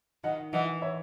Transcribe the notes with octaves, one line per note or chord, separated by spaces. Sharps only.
D#3 D#5 F#5
E3 D#5 F#5
C#5 E5